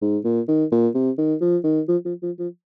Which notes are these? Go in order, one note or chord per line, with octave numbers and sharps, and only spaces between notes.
G#2
A#2
D#3
A#2
C3
D#3
F3
D#3
F3
F3
F3
F3